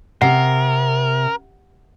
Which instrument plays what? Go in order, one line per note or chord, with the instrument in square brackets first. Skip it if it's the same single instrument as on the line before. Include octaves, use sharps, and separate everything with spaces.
[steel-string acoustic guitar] C3 [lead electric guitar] A#4 [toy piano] F#5